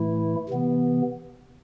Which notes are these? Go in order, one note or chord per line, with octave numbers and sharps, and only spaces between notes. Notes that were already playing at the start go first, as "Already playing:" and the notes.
Already playing: A2 E3 A3 E4
C3 E3 B3